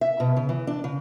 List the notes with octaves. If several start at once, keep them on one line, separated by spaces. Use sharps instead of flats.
E5
B2
C#3
E3
D4
C#3